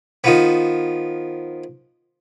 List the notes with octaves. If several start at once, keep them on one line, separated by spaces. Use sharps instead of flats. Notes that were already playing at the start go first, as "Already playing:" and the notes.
D#3 F3 B3